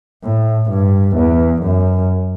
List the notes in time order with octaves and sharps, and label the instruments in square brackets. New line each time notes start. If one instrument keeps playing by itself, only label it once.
[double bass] A2
G2
E2
F#2